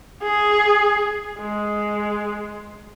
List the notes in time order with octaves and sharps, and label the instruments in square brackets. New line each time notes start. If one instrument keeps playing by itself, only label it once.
[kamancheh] G#4
G#3